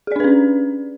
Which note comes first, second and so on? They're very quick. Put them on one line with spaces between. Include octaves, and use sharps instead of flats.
G#4 D5 D4 B4 C#4